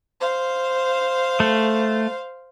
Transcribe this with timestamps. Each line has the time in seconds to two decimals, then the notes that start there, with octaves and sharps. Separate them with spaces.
0.20 C5 F5
1.40 A3